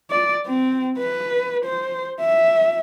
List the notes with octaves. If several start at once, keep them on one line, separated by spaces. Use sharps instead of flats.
D5
C4
B4
C5
E5